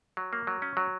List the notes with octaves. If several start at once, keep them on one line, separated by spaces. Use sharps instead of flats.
F#3
A#3
F#3
C#4
F#3